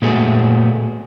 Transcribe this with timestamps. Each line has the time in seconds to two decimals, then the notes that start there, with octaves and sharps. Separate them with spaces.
0.02 A#2 G#3 A3 B3 F#4 G#4